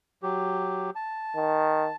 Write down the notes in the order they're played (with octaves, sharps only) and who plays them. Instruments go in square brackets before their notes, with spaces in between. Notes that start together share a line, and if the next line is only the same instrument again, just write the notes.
[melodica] F#3 G4
A5
[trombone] D#3